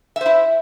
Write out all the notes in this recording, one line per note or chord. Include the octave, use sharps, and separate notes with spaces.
E4 C5 E5